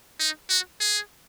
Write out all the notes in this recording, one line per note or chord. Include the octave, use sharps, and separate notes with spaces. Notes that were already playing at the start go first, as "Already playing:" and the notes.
D#4
F#4
G#4